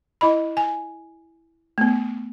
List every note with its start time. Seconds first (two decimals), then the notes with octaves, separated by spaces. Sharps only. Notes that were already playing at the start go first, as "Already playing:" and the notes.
0.21 E4 D#5 B5
0.57 G#5
1.78 A3 B3